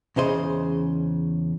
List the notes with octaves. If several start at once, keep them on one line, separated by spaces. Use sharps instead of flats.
E2 C#3 C5 D#5